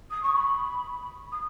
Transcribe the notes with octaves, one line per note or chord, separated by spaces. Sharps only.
D#6
C#6
B5
D#6